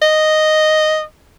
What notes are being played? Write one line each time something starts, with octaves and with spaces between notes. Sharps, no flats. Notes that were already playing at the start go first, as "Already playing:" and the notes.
D#5